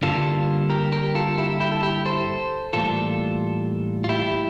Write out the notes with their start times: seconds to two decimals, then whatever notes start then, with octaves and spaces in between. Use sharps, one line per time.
0.02 G2 D3 G3 A#3 F4 A4
0.70 G4 A#4
0.92 G4 A#4
1.15 F4 A4
1.38 E4 G4
1.60 E4 G4
1.72 A4
1.83 E4 G4
2.06 A4 C5
2.73 A2 E3 G3 A#3 F4 A4
4.04 F4
4.09 E4 G4